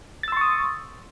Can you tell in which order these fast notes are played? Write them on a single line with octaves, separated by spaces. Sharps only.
A6 E6 C6 C#6 D#6